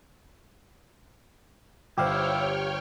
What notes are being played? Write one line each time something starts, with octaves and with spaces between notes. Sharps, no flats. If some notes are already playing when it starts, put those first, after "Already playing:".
G1 E4 G4 C5 C#5 F5 G5 F6